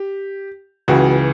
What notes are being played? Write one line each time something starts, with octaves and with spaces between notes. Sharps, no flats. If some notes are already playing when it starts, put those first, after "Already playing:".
Already playing: G4
C#2 C#3 E3 F#4